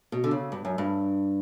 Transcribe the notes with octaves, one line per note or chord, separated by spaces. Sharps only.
B2
D3
C#3
G2
F#2
G2